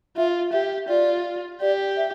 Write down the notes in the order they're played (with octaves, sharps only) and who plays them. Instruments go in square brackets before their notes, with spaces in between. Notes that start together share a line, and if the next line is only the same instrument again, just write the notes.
[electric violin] F4 [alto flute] E5
[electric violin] G4 [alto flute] E5
[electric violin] F4 [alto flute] D5
[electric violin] G4 [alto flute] D5
[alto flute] E5